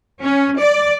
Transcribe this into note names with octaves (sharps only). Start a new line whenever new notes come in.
C#4
D5